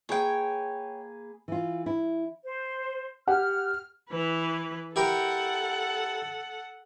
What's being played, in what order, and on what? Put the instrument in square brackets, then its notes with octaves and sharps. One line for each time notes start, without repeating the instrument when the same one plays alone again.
[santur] A#3 G#4 B4 [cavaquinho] C#5 G5
[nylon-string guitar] E3 F4
E4
[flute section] C5
[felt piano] G4 F#5 [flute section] F6
[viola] E3 B4
[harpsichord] E4 G4 A#4 [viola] A4 F#5